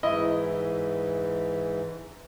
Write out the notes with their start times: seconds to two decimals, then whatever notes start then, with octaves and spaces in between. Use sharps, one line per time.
0.03 G#2 E3 E4 D#5